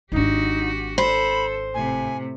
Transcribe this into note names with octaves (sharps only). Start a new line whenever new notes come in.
G#1 D4 D#4 F#4 G4
A4 C5 B5
A2 C3 G#5